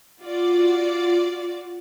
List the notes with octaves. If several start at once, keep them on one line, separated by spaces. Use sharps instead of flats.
F4 F#4 D5